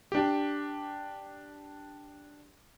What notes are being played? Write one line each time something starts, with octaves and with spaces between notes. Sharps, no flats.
D4 G4